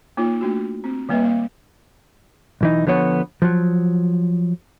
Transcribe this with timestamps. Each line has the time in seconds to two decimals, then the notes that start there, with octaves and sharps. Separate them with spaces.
0.17 A#3 D#4 F4 C#5
0.41 A3 D4 F#4
0.84 C4
1.09 D#3 G3 A#3 B4 D#5 E5
1.23 A#3 F5
2.61 B1 E3 D#4
2.87 D3 F3 B3 C#5
3.42 F3 F#3